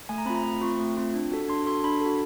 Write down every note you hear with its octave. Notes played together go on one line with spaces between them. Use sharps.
A3 G#5
A#5
C4 F4 B5
A#5
A3 B5
C4 F4 C#6
A3
C4 F4
D4
F#4 A4
D4 C6
F#4 A4 C6
D4 B5
F#4 A4